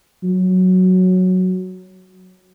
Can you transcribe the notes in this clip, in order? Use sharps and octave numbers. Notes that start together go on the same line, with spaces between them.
F#3